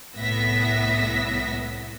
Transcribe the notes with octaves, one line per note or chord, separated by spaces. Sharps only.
C2 A2 B3 E5 A#6 B6